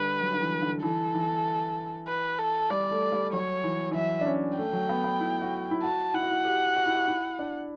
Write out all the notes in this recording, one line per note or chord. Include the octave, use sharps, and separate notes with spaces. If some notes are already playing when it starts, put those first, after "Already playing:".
Already playing: D3 G3 B4
F#3
D3
E3
D3
E3 A4
E3
B4
A4
G3 D5
A3
G3
F#3 C#5
E3
E3
F#3 E5
D4
C#4
A3 G5
F#3
B3
B3
E4
F#4
E4
F#4 A5
E4 F#5
F#4
E4
G4
F#4
E4
F#4
E4
D4